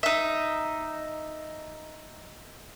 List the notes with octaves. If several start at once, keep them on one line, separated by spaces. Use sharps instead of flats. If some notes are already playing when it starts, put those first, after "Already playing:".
D#4 E5